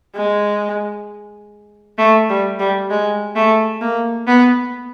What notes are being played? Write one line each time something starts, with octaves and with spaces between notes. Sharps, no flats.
G#3
A3
G3
G3
G#3
A3
A#3
B3